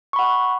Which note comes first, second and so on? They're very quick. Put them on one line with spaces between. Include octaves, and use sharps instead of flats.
C#6 B5 F#5